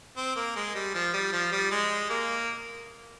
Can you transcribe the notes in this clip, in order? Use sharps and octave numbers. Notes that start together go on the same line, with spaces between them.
C4
A#3
G#3
G3
F3
G3
F3
G3
G#3
A#3